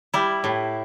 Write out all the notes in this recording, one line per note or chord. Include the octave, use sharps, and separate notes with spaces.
G3 E4
A2